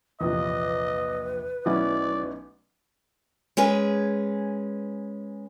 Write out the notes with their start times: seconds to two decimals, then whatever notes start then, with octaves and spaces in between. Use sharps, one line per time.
0.21 A#1 E2 C3 F3 B4 D#5
1.66 B1 F#3 A3 C#4 E4 F#4 D5
3.57 G#3 C#4 G#4 B4